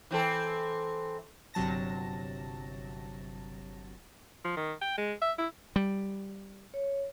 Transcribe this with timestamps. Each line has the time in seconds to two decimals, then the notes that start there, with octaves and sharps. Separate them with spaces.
0.11 E3 C4 A4
1.54 G1 C3 F#3 A5 A#6
4.45 F3
4.57 D#3
4.82 G5
4.98 G#3
5.22 E5
5.38 E4
5.76 G3
6.74 C#5